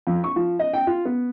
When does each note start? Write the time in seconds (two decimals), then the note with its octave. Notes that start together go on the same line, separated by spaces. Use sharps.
0.07 F2
0.24 C#6
0.36 F3
0.59 D#5
0.73 G5
0.87 F4
1.05 B3